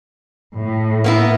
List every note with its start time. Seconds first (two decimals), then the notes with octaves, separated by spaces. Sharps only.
0.57 A2
1.04 A#3 B3 E4